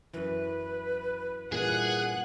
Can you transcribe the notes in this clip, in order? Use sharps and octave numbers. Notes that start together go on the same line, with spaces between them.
F#2 E3 B4
G2 A#2 E3 G#4 F#5 F#6